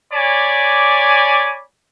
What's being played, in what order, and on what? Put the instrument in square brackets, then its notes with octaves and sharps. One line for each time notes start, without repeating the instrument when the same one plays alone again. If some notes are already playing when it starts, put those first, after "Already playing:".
[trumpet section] C#5 D5 G#5 B5 D6